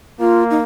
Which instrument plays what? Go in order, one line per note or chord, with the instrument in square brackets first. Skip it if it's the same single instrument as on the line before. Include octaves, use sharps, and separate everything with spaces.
[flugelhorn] A#3 [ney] F4
[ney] D#4